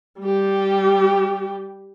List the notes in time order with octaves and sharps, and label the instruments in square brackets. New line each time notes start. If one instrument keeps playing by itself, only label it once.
[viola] G3 G4